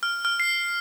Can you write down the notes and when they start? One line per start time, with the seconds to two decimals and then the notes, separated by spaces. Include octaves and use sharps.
0.03 F6
0.25 F6
0.40 C7